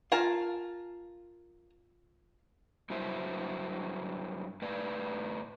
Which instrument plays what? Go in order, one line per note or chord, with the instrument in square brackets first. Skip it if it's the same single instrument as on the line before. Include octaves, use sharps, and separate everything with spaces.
[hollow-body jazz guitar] F4 [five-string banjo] A#4 G#5 A5
[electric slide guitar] G2 F#3 E4 C5 E5
A2 B4 D5